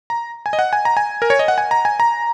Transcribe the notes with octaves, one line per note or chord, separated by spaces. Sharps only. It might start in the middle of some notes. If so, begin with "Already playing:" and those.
A#5
G#5
D#5
F#5
G#5
A#5
G#5
A#4
C#5
D#5
F#5
G#5
A#5
G#5
A#5